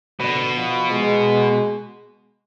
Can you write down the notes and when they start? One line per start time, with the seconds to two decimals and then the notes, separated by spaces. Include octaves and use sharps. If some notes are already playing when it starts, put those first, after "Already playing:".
0.20 B2 D3
0.55 F3
0.91 G#3